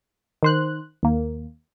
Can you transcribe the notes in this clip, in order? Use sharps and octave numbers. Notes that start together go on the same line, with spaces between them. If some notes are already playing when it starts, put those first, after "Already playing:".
D#3 C5 F#6
D#2 A#3